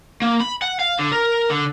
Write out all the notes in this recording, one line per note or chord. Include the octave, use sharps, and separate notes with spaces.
A#3
B5
F#5
F5
D3
A#4
D3